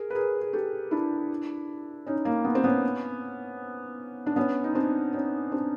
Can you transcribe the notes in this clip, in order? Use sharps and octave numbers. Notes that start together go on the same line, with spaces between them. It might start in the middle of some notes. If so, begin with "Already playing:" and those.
Already playing: G#4 A#4
B4
G#4 A#4
G#4
G4 A4
D4 E4
C#4 D#4
A#3
B3
C4
B3 C#4
D4
B3 C#4
D#4
C4 D4
C#4 D#4
C4 D4